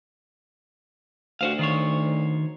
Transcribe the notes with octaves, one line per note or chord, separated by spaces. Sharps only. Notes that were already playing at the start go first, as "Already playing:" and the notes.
D2 F#4 C5 F5
D#3 C5 C#5